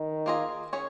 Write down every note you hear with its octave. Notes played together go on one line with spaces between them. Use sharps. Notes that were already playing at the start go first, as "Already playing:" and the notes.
Already playing: D#3
A#3 F4 G#4 D#5
C#4 G#4 C#5